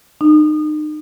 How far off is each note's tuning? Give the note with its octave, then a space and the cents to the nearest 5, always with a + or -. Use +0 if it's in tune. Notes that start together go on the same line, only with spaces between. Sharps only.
D#4 -35